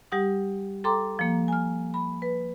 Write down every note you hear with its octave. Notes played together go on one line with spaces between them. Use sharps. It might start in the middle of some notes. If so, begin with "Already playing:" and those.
G3 G4 F#5 D#6
A4 G5 A#5 C6 D6
F3 A#3
G#5 F6
B5
B4